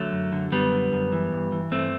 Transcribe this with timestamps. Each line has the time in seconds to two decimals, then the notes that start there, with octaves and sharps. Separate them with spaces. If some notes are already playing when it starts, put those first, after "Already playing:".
Already playing: D3 F#3 A3
0.12 F#2
0.32 D3
0.52 F#2 G3 B3
0.72 D3
0.92 F#2
1.12 E3
1.32 G2
1.52 E3
1.71 G2 A3 C4